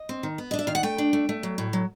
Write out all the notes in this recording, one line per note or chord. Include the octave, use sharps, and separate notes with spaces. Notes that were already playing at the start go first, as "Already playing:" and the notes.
Already playing: D#5
C4
D#3
B3
D#5
D4
E5
D#3 F5
F#5
A3 G5
D4
A3
A3
F#3
A2
F#3